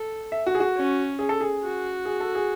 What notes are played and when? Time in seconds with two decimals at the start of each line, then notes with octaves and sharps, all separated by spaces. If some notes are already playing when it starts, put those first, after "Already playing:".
Already playing: A4
0.32 E5
0.46 F#4
0.55 G#4
0.60 F#4
0.76 C#4
1.19 G#4
1.29 A4
1.41 G#4
1.63 F#4
2.05 G#4
2.20 A4
2.35 G#4